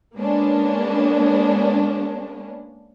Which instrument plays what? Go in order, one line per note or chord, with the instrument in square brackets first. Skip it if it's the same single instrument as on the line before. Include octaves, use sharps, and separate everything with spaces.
[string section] G#3 A#3 B3 C#4 D4